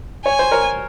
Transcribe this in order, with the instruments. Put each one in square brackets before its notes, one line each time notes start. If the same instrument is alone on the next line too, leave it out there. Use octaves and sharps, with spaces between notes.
[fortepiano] C#5 [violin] G#5
[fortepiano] C5
A#4 C#5